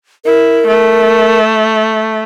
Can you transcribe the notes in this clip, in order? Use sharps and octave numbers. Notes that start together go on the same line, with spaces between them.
E4 A#4
A3